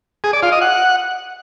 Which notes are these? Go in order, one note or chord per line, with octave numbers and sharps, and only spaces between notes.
G#4
D5
F4
D#5
F#5